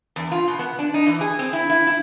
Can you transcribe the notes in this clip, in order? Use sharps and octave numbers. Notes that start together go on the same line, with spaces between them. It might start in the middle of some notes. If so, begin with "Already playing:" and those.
E2
F4
B2
B3
D4
D#4
E3
G#4
C4
E4
E4
E4